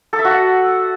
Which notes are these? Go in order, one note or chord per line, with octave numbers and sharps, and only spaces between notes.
A4
E5
F#4
F#5